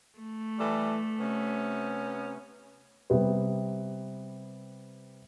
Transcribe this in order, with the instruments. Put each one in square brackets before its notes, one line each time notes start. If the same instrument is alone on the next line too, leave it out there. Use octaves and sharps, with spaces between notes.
[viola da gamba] A3
[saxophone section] E3 G3 A4
C3 B3 C#4
[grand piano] C3 G3 B3